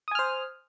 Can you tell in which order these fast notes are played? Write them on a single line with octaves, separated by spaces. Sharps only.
D#6 G#5 F6 C5